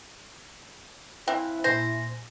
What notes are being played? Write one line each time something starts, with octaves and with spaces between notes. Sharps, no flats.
C4 E4 F5 G#5 F#6
A#2 C5 G#5 A#6